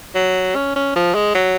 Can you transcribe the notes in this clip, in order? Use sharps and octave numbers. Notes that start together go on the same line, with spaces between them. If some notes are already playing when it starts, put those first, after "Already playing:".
F#3
C#4
C#4
F3
G#3
F#3